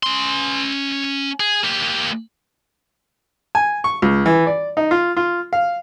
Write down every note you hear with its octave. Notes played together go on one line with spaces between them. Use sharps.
C#4 C6
G#4
A#3 G4
G#5
C#6
C#2
E3
D5
D#4
F4
F4
F5